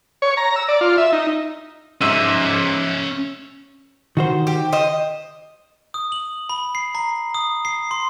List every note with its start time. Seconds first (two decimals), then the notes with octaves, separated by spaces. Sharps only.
0.22 C#5
0.37 A#5
0.56 E6
0.68 D5
0.81 F4
0.98 E5
1.12 D#4
2.01 G#2 C#4 E5 E6 D#7
4.17 D#3 F#4 C5
4.47 G4
4.72 C5 D#5
5.94 D#6
6.12 F#7
6.49 B5
6.75 C7
6.95 A#5
7.34 D#6
7.65 C7
7.91 C6